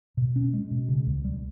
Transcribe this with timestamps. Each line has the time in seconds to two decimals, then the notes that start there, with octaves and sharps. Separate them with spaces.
0.17 B2
0.36 C#4
0.53 G#3
0.71 B2
0.89 C#3
1.06 C#2
1.25 G3